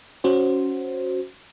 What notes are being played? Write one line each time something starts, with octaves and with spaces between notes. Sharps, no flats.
C#4 F#4 C5